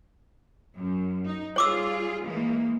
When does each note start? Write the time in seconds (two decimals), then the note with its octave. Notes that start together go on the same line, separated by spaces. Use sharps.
0.76 F#2
1.27 D#4
1.56 G3 F4 G#4 C#5 D6 E6
2.24 E3 G#3 A#3